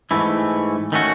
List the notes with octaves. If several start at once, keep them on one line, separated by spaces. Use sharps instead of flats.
G#2 E3 A3 E4
D#3 A3 C#4 F#4